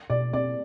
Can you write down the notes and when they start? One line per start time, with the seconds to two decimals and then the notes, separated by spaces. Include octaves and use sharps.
0.10 B2 D5
0.33 C4 D5